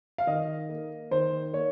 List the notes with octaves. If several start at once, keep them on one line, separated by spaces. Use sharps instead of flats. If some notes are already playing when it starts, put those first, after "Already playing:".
F5
D#3 D#5
A#3
D#3 C5
A#3 C#5